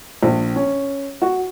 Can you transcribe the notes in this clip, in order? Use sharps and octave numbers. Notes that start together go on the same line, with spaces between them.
A#1
C#4
F#4